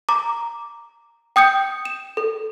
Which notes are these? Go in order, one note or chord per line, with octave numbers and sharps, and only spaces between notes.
A#5 D6
G5 D#6 G6 C#7
E7
A4